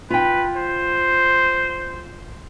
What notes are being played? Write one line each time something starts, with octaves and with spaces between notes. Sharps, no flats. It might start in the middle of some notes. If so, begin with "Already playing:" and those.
F4 B4 G5
C5